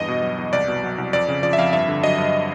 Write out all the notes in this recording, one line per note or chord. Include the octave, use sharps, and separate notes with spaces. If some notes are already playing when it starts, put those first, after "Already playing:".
Already playing: E2 G2 D#5
B2
F#3
E2
C2 D5
B2
F#3
C2
F2 D5
C#3
F3 D5
E5
F2 F5
G2 E5
D3
F#3 D#5
G2